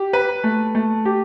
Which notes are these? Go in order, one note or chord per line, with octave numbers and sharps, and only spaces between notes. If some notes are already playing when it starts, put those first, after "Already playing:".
Already playing: G4
B4
A3
A3
G4